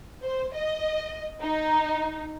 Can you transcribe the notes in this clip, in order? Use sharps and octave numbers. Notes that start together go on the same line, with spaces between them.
C5
D#5
D#4